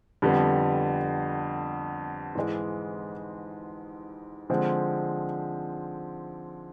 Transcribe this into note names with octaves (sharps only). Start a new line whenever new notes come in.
F2 D3 G3 B3
G#2 E3 G#3
D3 F3 G#3 C4